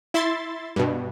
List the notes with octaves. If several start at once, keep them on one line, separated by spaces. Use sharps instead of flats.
E4 E5 C6 A6
G2 B2